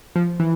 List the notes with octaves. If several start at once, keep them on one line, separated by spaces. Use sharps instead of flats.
F3
E3